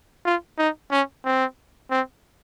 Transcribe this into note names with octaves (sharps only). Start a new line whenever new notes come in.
F4
D#4
C#4
C4
C4